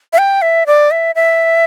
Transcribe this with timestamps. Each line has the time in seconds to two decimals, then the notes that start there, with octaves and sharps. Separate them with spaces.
0.13 E5
0.18 G5
0.42 E5
0.67 D5
0.91 E5
1.15 E5